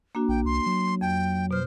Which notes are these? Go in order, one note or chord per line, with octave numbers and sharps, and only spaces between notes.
A#3 D4 F#4
A#1 G5
C2 C6
F#3
F2 G5
B2 C5 F6